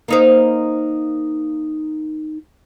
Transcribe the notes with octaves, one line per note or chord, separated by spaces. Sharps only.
A#3 D#4 C5